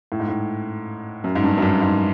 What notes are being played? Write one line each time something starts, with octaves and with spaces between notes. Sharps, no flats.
A2
G#2
A2
F#2
G#2
G2
F#2
G2
G#2